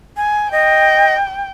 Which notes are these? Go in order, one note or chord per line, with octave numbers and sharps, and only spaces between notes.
G#5
D#5 G5